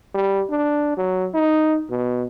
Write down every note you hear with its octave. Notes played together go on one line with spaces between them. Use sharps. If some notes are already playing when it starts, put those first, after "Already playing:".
G3
D4
F#3
D#4
B2